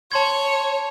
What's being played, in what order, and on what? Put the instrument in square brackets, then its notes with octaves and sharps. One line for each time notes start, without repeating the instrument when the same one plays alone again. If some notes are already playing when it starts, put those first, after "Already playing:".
[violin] C#5 [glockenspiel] A5 C6 G#6